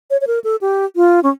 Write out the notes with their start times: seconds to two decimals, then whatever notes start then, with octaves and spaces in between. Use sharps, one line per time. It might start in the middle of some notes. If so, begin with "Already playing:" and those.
0.10 C#5
0.21 C#5
0.27 A#4
0.44 A4
0.61 G4
0.96 F4
1.23 C#4